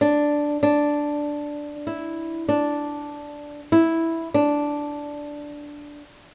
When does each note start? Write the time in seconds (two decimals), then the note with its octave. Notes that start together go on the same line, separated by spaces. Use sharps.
0.01 D4
0.63 D4
1.87 E4
2.49 D4
3.72 E4
4.34 D4